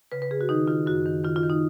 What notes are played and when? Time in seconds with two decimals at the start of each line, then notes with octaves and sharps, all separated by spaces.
0.12 C#3 B4
0.22 B4
0.31 C#3 G#4
0.41 F#4
0.49 D#3 D#4
0.68 D#3 F4
0.86 F#2 F#4
1.06 D#3
1.24 D#3 F4
1.36 F4
1.43 D#3
1.50 D#4